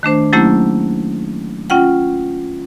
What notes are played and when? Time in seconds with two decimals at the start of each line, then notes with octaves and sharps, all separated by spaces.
0.03 D#3 A3 D4 C5
0.33 F#3 A3 A#3 C#4 E4 G4
1.70 C#4 F4 F#5 G5